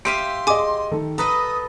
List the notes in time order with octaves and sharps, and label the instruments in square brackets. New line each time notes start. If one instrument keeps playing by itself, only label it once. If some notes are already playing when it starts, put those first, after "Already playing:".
[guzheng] G4 E5 F5 [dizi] C6 [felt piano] D7 D#7
[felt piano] G#4 D#5 [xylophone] G#5 D6
[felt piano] D#3 A4
[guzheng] A4 B4 D#5 [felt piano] A#5 [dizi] D#6